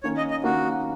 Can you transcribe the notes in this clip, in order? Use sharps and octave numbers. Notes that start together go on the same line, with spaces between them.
D#3 A#3 C#4 C#5
D#5
D#5
D#3 A#3 C#4 F#4